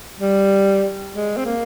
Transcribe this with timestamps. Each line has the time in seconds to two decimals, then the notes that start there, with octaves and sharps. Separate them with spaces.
0.19 G3
1.14 G#3
1.37 C4
1.46 A#3